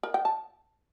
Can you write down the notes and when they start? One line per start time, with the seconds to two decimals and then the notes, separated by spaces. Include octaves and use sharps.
0.03 A#4
0.14 G5
0.25 A5